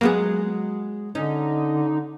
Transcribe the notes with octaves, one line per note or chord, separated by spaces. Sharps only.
F#3 G#3 A#3 B3 G#4
D3 C#4 D#4